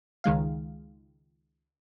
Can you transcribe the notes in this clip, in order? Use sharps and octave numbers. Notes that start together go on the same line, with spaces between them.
C#2 D#3 G#3 F5